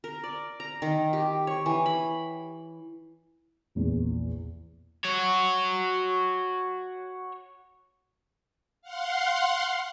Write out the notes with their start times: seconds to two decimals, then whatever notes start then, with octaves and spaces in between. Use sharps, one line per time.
0.04 A#4
0.24 D5
0.60 A#5
0.82 D#3
1.13 G4
1.47 C#5
1.66 E3
1.86 B5
3.75 A#1 E2
5.05 F#4 C#5
8.82 F5 F#5 C6